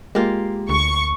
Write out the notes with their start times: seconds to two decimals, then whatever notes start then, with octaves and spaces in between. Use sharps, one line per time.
0.15 G#3 A#3 F4 G4
0.69 D2 C#6